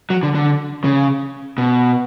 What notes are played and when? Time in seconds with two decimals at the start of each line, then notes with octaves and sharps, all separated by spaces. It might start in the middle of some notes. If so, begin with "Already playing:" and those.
0.10 F#3
0.23 D3
0.35 D3
0.84 C#3
1.58 B2